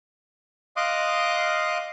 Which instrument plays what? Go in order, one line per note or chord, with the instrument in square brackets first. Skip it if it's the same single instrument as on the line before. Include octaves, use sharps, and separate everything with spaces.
[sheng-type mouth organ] D#5 F5 C6 D6 D#6 F#6